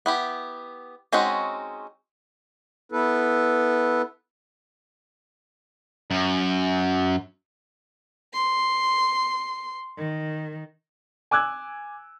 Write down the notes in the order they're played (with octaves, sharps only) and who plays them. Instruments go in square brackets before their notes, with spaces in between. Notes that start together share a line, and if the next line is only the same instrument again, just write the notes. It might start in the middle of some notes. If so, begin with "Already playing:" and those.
[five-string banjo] B3 E4 G4
G#3 C4 C#4 D#4 F#4
[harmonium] B3 E4 A4 B4
[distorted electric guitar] F#2
[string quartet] C6
D#3
[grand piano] G#5 D6 E6 F#6 G#6